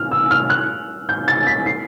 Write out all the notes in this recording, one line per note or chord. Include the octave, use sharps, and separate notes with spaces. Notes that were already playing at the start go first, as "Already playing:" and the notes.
Already playing: F6
E6
F6
F#6
G6
A6
B6
C7